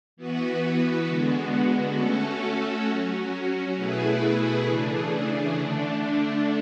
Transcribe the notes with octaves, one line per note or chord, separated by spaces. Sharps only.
E3 B3 F#4 B4
D3 G#3 B3 F#4
A3 C#4 F#4 A4
F#3 C#4 F#4
B2 A3 E4 G#4 B4
C#3 E3 A3 D4 G#4
D3 A3 D4